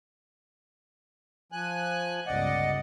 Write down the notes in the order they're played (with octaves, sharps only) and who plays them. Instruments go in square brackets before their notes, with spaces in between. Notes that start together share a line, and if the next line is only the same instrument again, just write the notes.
[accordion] F3 G#5 F#6
[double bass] G1 C#2 [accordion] D5 D#5 F#5